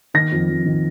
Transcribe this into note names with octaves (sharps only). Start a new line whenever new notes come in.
D#3 A#6
F2
F2
D#3